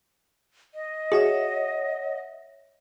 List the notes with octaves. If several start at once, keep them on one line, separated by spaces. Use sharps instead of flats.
D#5
F#4 G#4 C#5 E5 F#5